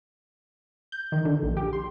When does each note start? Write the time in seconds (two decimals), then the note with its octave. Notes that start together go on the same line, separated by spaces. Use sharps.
0.92 G6
1.12 D#3
1.25 D3
1.43 A#1
1.57 G4
1.73 C6